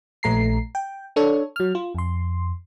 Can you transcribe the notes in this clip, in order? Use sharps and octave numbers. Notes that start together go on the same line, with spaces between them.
A#1 A3 A#5 C7
G5
D4 A4 C#5
F#3 F6
F4
F2 C6